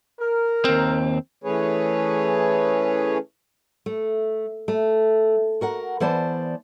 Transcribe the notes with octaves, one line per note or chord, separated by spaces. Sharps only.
A#4
D#2 C4
E3 A3 C#4 G#4 B4 C#5
A3
A3
F#4 A#4 F#5
E3 B3 C5 D5 A5